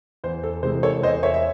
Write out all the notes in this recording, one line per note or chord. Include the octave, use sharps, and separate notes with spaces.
E2 C5
A4
C3 E3 G#3 C5
A4 C#5
E2 C5 D#5
C#5 E5
E5